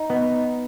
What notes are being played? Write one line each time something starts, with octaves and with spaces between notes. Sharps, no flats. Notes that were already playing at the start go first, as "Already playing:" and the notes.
Already playing: D#4
B3